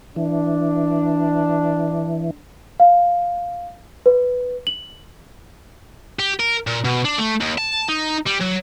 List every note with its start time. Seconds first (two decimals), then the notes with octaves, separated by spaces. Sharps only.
0.16 E3 D4
2.80 F5
4.06 B4
4.67 F#7
6.19 G4
6.40 A#4
6.67 A#2
6.85 B2
7.05 D4
7.18 A3
7.40 D#2
7.58 A5
7.89 D#4
8.27 G3
8.41 F#3